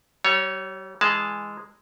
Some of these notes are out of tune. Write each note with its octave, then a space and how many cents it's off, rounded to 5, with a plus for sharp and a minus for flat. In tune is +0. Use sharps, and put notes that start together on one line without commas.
G3 -40 C#5 +0
E3 +0 G#3 -5 A5 -15